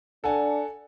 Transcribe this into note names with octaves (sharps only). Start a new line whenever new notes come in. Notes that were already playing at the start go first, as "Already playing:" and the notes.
D4 A4 F#5 G#5